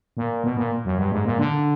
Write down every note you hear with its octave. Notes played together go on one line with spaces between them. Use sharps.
A#2
B2
A#2
F#2
G2
G#2
A#2
D3